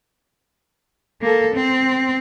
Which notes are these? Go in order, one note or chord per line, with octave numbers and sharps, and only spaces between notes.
A#3 A4
C4